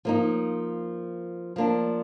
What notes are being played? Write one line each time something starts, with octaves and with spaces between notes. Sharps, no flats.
F3 A#3 D#4
F3 A#3 D4